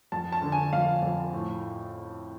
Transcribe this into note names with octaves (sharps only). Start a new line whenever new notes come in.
F2 A5
A5
D3
G#5
F2 F5
F2
A2